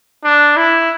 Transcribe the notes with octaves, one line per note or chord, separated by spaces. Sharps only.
D4
E4